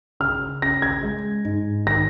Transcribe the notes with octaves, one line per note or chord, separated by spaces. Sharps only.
C#3 F6
C#4 A#6
G#6
G#3
G#2
D#3 A#6